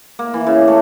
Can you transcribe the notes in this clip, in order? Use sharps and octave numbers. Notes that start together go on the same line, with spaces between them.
A#3
E3
C#3
A3